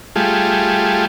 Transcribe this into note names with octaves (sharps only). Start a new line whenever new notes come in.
G3 A3 F4 G#4